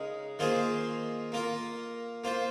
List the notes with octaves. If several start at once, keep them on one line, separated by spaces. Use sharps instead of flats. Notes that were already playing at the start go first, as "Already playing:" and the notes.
Already playing: C#3 G#3 D#4 A#4
D#3 A#3 F4 G#4 C5
A#3 F4 A#4
A#3 F4 C5